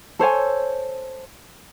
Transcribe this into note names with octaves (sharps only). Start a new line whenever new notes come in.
A4 C5 C#5 G#5